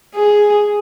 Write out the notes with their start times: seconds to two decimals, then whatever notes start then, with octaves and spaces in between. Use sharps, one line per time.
0.15 G#4